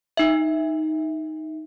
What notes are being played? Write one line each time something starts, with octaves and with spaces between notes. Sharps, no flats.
D#4 E5